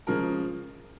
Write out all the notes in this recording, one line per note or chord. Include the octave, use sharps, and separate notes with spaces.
C#3 F3 G#3 A#4